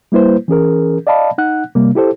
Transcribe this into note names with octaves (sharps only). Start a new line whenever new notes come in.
G3 A#3 E4 B4 C5
E3 C#4 G#4 A#4
D5 D#5 F5 A5 B5
D#4 F#5 F#6
C3 G3 A#3
E4 G4 A4 C5